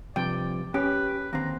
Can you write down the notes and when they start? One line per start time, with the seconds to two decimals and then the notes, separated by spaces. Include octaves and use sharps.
0.16 G2 C3 F3 D5 G5
0.74 C#4 G4 B4
1.33 D#2 D3 C4 A#5